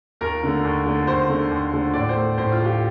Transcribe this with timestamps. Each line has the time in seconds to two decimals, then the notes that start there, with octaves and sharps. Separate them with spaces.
0.21 D#2 A#4
0.43 D3 A3
0.64 D#2
0.85 D3 A3
1.07 D#2 C5
1.29 D3 A3
1.51 D#2
1.72 D3 A3
1.93 A2 D5
2.09 C5
2.16 A3
2.38 A2 C5
2.52 F4
2.59 A3
2.65 G4